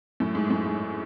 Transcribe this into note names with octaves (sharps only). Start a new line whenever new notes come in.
F#2 A2
G#2
F#2 A2
G#2